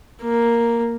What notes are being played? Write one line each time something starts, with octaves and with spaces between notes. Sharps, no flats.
A#3